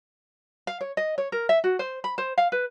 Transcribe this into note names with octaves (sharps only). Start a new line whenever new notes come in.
F5
C#5
D#5
C#5
A#4
E5
F#4
C5
B5
C5
F5
B4